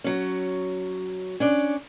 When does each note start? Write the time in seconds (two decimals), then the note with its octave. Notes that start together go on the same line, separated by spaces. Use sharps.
0.04 F#3 C#4
1.40 C#4 D4 D5